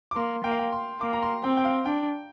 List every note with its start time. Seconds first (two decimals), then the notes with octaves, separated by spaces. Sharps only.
0.11 D6
0.16 A#3 C6
0.44 A#3 G5
0.52 F5
0.59 G5
0.72 C6
1.01 A#3 D6
1.13 A#5
1.23 C6
1.43 C4 G5
1.57 G5
1.65 F5
1.85 D4 G5